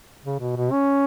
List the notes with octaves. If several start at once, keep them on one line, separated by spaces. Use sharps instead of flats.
C#3
B2
B2
C#4